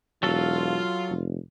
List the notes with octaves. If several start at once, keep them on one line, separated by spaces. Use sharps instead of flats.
E1 F#3 F4 A4
F1